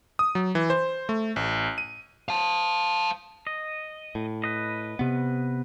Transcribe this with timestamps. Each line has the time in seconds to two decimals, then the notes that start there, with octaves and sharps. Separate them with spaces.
0.19 D#6
0.35 F#3
0.55 E3
0.70 C5
1.09 A3
1.36 A1
1.78 D#7
2.29 F5 A5
3.47 D#5
4.15 A2
4.44 B4 D#5
4.99 C3 B3